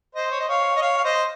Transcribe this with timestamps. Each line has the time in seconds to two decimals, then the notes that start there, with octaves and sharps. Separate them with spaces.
0.15 C5 D#5
0.31 C#5
0.40 D#5
0.48 C#5 F5
0.76 D#5
0.82 C#5 F5
0.97 F5
1.04 C5 D#5